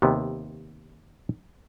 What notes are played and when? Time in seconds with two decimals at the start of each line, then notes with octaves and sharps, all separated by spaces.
0.02 D#2 C3 B3